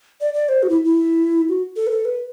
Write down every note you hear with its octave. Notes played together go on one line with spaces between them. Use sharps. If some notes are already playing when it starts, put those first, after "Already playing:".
D5
D5
C5
F#4
E4
E4
F#4
A4
B4
A4
B4